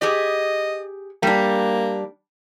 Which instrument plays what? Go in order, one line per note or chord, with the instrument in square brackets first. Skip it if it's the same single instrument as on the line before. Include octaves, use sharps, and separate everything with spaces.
[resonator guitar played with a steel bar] G4 G#4 [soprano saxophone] D#5
[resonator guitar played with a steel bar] G3 D4 [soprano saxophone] A#3